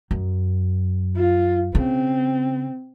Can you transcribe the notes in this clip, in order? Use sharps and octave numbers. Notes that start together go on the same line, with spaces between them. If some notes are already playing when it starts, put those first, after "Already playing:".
F#2
F4
C#3 C4